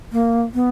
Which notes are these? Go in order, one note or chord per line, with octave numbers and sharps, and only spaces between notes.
A#3
B3